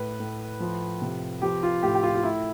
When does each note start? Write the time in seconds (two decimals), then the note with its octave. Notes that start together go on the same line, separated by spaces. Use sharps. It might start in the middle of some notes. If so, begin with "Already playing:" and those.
Already playing: A2 B4
0.20 A2
0.60 F3
1.01 C3
1.42 F3 G4
1.63 F4
1.83 A2 G4
1.95 G4
2.03 F4
2.15 F4
2.23 A2 E4